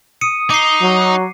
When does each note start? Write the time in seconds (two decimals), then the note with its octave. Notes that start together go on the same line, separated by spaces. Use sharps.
0.21 D#6 C#7 D#7
0.50 D#4 D6 C7
0.81 F#3